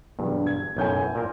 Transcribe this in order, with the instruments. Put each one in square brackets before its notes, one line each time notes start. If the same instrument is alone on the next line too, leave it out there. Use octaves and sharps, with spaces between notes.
[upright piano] E1 D2 F#3 [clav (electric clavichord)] G2
[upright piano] G#6
[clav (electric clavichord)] B1 F#2 A2 [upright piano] G#5 G6 G#6
[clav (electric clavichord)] A#2 A#4